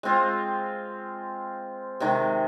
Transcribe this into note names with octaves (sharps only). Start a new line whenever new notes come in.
G#3 C4 F4
C3 D#3 G#3